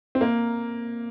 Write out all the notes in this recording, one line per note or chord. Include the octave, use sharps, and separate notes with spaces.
C4
A#3